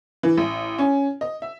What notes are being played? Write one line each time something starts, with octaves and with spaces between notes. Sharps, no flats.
E3
A1
C#4
D#5
E5